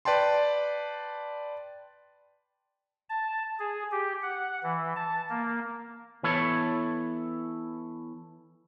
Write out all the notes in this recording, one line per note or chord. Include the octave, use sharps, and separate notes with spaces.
B4 D5 G5 A5 C6
A5
G#4
G4
F#5
E3
A5
A#3
E3 B3 E4 A4 C#5